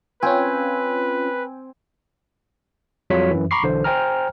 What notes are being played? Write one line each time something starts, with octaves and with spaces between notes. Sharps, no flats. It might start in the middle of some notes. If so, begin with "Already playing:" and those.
C4 C#4 F4 B4 G5 G#5
F2 F#3 G3 F4 C#5 B6
F#2 E3
A#5 B5 C#6 D6 C7
B1 D3 E3 C5
C5 G5 G#5 A#5 F6